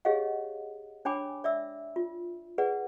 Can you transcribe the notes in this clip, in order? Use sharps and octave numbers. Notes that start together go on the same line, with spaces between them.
G4 G#4 C#5 D#5 F5 F#5
D4 C#5 G5 G#5 B5 D6
D5 E5 E6
F4
G#4 B4 D5 F#5